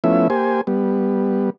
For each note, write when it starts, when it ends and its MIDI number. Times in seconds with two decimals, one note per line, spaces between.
0.04 0.28 53
0.04 0.28 57
0.04 0.28 59
0.04 0.28 61
0.04 0.28 64
0.04 0.28 76
0.30 0.61 58
0.30 0.61 67
0.30 0.61 72
0.30 0.61 80
0.67 1.50 55
0.67 1.50 59